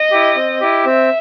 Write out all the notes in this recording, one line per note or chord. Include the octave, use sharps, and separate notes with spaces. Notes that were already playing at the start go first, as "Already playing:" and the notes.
Already playing: D#5
E4 G4
C4
E4 G4
C4 E5